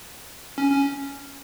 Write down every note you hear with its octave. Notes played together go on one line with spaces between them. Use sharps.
C#4
C#4